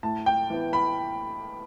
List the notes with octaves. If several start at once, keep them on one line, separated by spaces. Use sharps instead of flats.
A2 A5
G5
E3 B3
B5